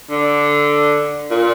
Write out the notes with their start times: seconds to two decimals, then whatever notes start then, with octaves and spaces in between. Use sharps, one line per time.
0.11 D3
1.30 A#2